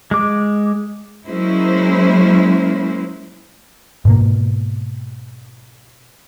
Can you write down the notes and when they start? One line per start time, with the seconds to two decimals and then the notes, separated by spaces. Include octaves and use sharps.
0.11 G#3 D6
1.27 F#3 G#3 A#3 C#4 E4 C5
4.05 G#2 B2 A#3